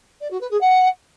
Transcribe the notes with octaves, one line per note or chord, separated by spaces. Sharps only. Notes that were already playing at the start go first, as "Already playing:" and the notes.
D5
F#4
B4
G#4
F#5